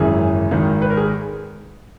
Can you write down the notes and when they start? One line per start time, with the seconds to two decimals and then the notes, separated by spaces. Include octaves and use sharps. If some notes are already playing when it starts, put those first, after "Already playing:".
Already playing: G#1 F#2 C#3 E3 G#4
0.51 G#1 G#2 D#3
0.82 B4
0.90 A#4
0.97 G#4